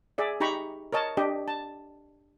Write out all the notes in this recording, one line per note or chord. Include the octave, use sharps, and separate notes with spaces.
G#4 D5 E5
D#4 G4 A#5 B5 C#6
A#4 C#5 D#5 A5
D4 G4 D#5
A5